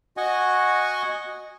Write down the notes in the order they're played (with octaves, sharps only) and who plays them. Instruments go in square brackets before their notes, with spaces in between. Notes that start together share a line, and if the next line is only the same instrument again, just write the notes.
[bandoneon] F#4 D#5 F#5 G#5 C#6